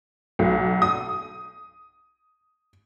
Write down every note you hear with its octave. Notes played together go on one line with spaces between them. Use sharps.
B1
D#6